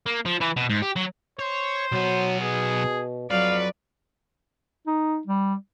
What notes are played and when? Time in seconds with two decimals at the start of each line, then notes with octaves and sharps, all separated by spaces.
0.06 A#3
0.26 F3
0.41 E3
0.57 B2
0.70 G#2
0.82 G4
0.96 F#3
1.39 C5 C#5
1.92 B1 F#3 B3
2.41 B2 G#4
3.31 F2 F#3 B4 D5 F5
4.87 D#4
5.27 G3